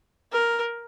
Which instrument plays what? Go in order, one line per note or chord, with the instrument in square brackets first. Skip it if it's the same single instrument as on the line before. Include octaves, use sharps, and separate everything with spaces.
[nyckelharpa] A#4